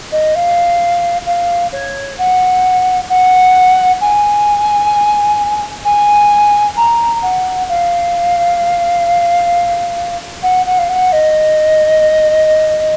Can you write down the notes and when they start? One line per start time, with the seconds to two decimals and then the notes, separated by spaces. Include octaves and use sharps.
0.12 D#5
0.35 F5
1.26 F5
1.72 C#5
2.18 F#5
3.09 F#5
4.01 G#5
5.85 G#5
6.76 A#5
7.22 F#5
7.69 F5
10.43 F#5
10.66 F#5
10.78 F5
10.89 F#5
11.12 D#5